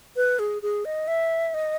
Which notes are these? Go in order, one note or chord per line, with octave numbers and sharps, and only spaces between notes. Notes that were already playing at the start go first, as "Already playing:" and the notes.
B4
G#4
G#4
D#5
E5
D#5